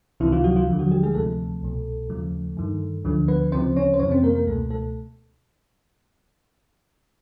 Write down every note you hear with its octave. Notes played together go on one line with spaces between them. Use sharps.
C#2 C3 D#3 E3 E4
F3 F4
F#3 F#4
F3 F4
D#2 D3 F3
F#3 F#4
G3 G4
G#3 G#4
D2 C3 F3 A3 A4
C2 B2
D#2 C#3 F3
G2 D#3
D2 D3 F3
B3 B4
D2 C#3 F3 C4 C5
C#4 C#5
C5
F2 C3 E3 C#4 C#5
C4 C5
A#3 A#4
A#3 A#4
C#2 B2 A3 A4
A3 A4